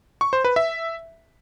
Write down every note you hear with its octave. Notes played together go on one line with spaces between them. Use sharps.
C#6
C5
B4
E5